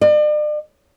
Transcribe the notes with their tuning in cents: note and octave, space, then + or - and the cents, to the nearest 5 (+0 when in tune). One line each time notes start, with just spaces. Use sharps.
D5 +40